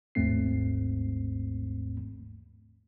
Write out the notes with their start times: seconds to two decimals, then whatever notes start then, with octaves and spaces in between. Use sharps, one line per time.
0.15 G#1 D#2 G#2 A3 C4 C7